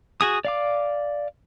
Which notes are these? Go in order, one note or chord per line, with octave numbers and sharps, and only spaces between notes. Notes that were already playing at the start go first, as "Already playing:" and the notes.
F#4 G#4 D#6
D5 F5 D6